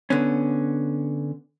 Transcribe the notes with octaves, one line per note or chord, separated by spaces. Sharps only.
D3 B3 C#4